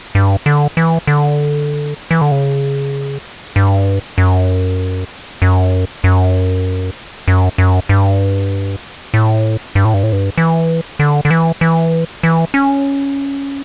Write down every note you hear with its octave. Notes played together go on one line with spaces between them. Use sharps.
G2
D3
E3
D3
E3
D3
C#3
G2
F#2
F#2
F#2
F#2
F#2
G2
A2
G2
A2
G2
A2
G2
E3
D3
D3
E3
E3
E3
C#4